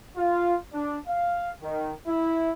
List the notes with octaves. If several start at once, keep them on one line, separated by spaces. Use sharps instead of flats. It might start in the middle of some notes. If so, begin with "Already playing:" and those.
F4
D4
F5
D#3
E4